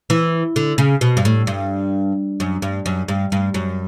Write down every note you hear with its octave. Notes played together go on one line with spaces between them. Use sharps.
E3
D3
C#3
B2
G2
A2
G2
F#2
G2
F#2
G2
G2
F#2